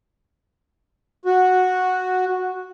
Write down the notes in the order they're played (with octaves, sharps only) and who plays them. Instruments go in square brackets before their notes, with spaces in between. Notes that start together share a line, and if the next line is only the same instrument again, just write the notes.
[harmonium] F#4